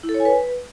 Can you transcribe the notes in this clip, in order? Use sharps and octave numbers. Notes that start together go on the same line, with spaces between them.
E4
A4
C#5
G#5
B4